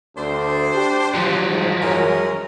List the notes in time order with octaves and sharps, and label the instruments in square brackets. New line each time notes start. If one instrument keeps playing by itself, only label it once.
[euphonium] D2 [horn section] D4 C5
[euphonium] G4
[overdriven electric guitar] F3 F#3
[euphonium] G#2
[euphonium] F#2 [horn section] G#3 C#4 A#4